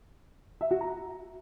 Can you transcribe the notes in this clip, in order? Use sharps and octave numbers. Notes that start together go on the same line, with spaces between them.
E5
F#4
A#5